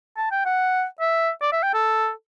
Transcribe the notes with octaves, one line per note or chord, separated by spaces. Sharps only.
A5
G5
F#5
E5
D5
E5
G5
A4